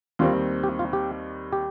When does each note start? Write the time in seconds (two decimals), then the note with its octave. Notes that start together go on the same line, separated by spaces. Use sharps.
0.19 D#2 D#3 G3 C4 F4
0.64 G4
0.79 F4
0.93 G4
1.53 G4